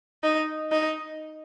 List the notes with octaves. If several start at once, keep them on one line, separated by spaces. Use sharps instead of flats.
D#4
D#4